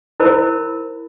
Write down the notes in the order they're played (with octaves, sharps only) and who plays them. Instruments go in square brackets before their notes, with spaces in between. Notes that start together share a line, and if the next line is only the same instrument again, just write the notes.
[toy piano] E4 A#4 C5 B5